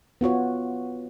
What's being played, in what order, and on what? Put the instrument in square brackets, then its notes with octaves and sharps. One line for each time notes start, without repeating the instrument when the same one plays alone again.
[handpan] B3 F4 F#4 C#5